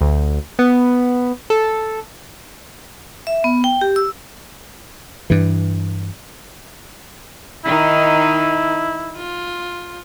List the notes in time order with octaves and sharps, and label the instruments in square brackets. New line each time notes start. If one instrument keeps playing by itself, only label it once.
[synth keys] D2
B3
A4
[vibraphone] E5
B3
G5
G4
E6
[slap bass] G2 E3
[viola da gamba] D#3 D#4 [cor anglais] E4
[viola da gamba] F4